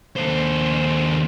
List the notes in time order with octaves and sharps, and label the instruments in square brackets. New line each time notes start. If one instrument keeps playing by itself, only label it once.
[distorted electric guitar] D#2 C5